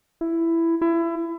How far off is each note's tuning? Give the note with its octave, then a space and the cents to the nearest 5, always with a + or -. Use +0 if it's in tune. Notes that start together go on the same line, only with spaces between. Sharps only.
E4 +10
E4 +25